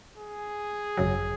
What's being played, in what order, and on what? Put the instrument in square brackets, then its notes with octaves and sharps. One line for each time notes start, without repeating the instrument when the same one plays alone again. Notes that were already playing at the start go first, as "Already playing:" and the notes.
[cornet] G#4
[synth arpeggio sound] G#1 F#2 C#3 F#3